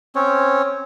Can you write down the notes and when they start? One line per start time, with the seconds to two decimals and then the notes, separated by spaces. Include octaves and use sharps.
0.15 C4 C#4 C#5